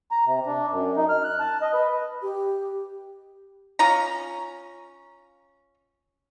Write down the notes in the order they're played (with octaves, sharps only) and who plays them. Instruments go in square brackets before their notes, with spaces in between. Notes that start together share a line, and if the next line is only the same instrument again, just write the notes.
[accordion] A#5
C3
D4
F#2
D#4
F6
F#6
A5
D#5
B4
[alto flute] G4
[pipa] C#4 F4 C#5 A#5